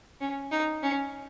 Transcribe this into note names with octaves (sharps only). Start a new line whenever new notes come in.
C#4
D#4
C#4